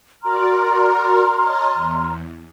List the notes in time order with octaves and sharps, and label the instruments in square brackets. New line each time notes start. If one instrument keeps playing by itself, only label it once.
[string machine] F#4 A#4 D5 [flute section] A#5 C6 F6
[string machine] C#5 D#5 A5
E2